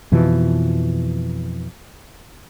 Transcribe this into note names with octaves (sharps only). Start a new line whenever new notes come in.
F2 B2 E3 F3